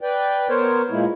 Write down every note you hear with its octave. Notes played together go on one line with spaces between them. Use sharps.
B4 D5 G5
B3 A#4 C5 C#5
A#2 G#3 A#3 E4